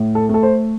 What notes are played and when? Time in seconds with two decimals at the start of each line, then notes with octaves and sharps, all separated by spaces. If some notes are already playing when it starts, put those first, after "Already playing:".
Already playing: A2
0.15 A4
0.29 A3 A4
0.43 C5